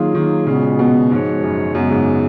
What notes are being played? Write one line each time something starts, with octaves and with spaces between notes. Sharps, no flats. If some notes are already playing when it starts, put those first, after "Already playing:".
Already playing: D#3 F#3 A#3 F4 G#4
D#3
A#2 C#3 G#3 B3 F#4
B2
G#2 F3 G#3 B3 F#4 C#5
F#2
F#2 C#3 G#3 B3
G#2